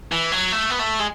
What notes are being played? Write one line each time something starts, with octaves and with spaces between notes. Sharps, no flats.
E3
F#3
A3
B3
A3
G#3